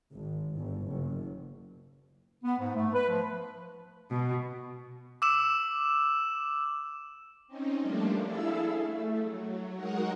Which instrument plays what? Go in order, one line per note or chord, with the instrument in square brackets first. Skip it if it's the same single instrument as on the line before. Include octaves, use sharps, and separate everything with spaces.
[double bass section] G#1
G1
F#1
[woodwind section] B3
G#2
A3
B4
F3
[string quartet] B2
[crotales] D6 E6 E7
[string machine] C4 C#4 D#4
F3 G3 A3 A#3 D4
E4 G#4 A4 E5 F5 E6
A3
F#3
G#3 D#4 F#4 A#4 F#5